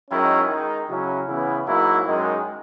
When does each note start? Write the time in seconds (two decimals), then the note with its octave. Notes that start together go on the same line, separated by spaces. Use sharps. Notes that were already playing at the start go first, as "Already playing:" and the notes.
0.10 F#2 D#3 G#3 C#4 E4
0.49 D#3 G#3 D#4
0.88 C#3 F#3 C#4 E4
1.27 C#3 E3 B3 E4
1.67 G#2 F#3 A#3 E4
2.05 F#2 D#3 G#3